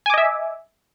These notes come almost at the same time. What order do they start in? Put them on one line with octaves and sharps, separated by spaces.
G#5 D6 D#5 E5